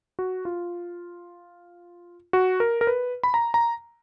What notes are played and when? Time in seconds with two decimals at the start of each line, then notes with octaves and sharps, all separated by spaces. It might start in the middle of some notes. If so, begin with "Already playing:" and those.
0.19 F#4
0.45 F4
2.33 F#4
2.60 A#4
2.81 A#4
2.87 B4
3.23 B5
3.34 A#5
3.54 A#5